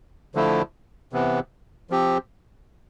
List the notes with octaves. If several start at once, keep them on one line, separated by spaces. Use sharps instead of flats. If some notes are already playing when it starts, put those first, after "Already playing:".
D3 F3 A3 E4
C3 E3 B3
F3 C4 G4